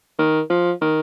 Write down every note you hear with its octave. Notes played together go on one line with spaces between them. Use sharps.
D#3
F3
D#3